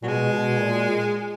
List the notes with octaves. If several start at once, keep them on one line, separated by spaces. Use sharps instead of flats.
A#2 F#3
B2 G#3
B2
A#2